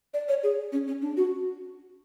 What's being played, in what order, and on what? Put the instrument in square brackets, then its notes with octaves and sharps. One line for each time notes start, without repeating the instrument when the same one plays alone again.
[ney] D5
C#5
G#4
C#4
C#4
D4
F#4